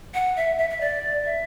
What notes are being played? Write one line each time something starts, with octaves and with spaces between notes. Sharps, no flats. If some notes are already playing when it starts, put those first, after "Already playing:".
F#5
E5
E5
E5
D5
E5